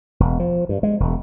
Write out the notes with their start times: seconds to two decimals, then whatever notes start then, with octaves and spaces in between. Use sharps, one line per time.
0.20 E1
0.40 F3
0.69 G2
0.83 G#3
1.00 E1